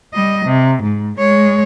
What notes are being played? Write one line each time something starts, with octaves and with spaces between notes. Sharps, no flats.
G3 D#5
C3
G#2
G#3 C#5